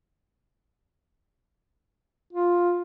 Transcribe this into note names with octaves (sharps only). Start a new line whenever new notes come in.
F4